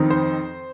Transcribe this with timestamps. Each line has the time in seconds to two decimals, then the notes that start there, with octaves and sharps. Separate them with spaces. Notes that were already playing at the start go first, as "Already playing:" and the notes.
Already playing: F2 D#3 C4 D#4
0.10 C5